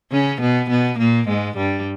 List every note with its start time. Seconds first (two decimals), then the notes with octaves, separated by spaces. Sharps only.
0.12 C#3 C#4
0.41 B2 B3
0.70 B2 B3
0.99 A#2 A#3
1.28 G#2 G#3
1.57 G2 G3